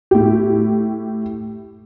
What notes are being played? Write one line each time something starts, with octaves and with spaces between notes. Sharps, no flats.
A2 G4